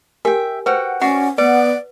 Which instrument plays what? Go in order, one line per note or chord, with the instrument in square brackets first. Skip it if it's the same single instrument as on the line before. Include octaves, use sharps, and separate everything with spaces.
[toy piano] G4 A#4 G#5 [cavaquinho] E5 G5
[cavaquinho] F#4 F#5 G5 [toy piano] B4 C5
[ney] C#4 [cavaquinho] F#4 D5 [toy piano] F#5
[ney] B3 [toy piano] B4 [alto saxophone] D5 [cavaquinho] F#5